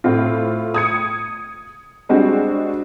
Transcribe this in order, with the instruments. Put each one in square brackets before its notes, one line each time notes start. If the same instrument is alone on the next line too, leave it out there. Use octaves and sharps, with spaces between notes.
[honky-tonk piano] A2 C4 F4
D#6 G#6 C#7
G3 G#3 C4 D4 F#4